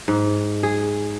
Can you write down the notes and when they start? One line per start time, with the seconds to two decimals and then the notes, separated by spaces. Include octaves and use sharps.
0.08 G#2
0.63 G#4